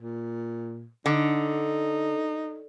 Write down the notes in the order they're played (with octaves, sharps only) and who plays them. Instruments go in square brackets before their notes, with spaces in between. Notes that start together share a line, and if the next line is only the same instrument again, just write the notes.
[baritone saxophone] A#2
[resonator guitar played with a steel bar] D3 [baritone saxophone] D#4